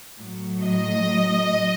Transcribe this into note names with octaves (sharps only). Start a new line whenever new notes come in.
A2 F#3
D#5